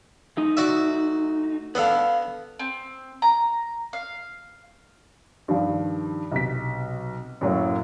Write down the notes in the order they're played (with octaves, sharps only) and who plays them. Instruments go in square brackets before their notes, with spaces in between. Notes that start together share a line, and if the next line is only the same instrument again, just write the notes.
[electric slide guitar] A3 D#4
[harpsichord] F#4 D5 E5
[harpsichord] B3 D4 A4 [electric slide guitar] B4 F5
[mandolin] C4
A#5
F5
[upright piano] G2 D#3 F3 G3
B1 C3 B6
F#2 A2 F#3 A#3